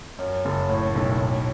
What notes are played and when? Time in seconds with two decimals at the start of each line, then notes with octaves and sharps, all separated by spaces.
0.19 F#2
0.45 F#1
0.69 A2
0.96 B1
1.20 A2